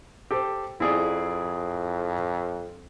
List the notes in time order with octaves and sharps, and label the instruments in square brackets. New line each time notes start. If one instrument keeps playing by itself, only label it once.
[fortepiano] G4 A4 C5
[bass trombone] F2 [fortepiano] E4 G#4 D5